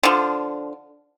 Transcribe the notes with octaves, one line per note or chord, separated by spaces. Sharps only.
D3 F3